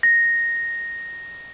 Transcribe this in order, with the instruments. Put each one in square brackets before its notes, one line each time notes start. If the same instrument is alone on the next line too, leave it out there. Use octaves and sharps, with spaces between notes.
[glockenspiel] A#6